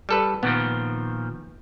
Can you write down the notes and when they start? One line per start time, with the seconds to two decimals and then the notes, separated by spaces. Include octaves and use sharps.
0.09 G3 A4 B4
0.43 A#2 D#3 F3 B3